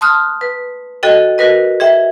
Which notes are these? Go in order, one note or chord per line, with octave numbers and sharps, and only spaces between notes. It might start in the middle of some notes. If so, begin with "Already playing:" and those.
A5 C6 D#6 F6 F#6
B4
F#4 A4 D#5 G5
F#4 A#4 B4 D#5
G#4 E5 G5